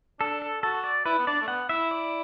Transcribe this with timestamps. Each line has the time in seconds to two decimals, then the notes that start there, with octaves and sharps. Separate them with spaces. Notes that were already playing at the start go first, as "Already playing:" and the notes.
0.20 D4 A4
0.42 A4
0.62 F#4 A4
0.84 D5
1.06 E4 B4
1.19 B3
1.27 D4 D5
1.41 A3
1.48 B3 F#5
1.69 E4 E5
1.91 D5